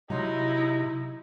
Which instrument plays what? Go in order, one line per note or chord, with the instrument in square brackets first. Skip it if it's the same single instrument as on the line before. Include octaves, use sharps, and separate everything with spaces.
[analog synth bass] C3 [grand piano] F#3 C6 [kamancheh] D#4 E4 [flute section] D#5